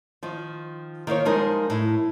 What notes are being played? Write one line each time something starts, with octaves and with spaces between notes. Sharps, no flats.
D#3 F3
D#3 A#3 C5 C#5
F3 G3 G#3 D#4 A#4
A2